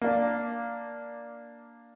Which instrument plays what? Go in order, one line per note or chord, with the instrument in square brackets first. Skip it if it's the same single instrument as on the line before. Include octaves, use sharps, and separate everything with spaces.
[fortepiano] A#3 D4